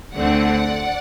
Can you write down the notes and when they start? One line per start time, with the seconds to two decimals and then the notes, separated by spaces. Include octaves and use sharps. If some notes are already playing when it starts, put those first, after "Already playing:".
0.15 D2 D3 A3 C4 D5 F#5